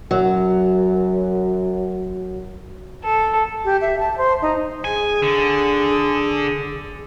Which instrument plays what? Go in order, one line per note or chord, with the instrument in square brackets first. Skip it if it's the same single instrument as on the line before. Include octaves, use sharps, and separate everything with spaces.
[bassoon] F#2 [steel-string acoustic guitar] F#3
[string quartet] A4
[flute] G4
E5
A5
C5
D#4
[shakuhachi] G#4 [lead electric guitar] G#5
[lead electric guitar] D3